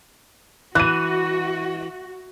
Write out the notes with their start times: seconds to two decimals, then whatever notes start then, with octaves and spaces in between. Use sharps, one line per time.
0.75 E3 F#4 F#6 D#7